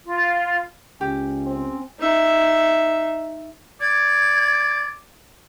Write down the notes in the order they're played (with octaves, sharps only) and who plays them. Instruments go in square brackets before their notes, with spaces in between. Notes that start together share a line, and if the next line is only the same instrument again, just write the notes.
[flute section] F4
[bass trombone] C#2 [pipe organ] C#4 [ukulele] G4
[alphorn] C4
[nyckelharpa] D#4 E5
[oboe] D5 [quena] G#6